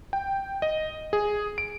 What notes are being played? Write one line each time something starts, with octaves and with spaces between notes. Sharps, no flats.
G5
D#5
G#4
D7